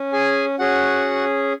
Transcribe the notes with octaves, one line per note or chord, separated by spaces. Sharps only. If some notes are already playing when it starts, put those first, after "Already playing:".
Already playing: C#4
G#4 G#5
C#4 F#4 G#4 F#5